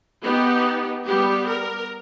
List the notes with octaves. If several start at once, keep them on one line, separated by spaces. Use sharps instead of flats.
B3 D#4 G4
G3 B3 G4
A#4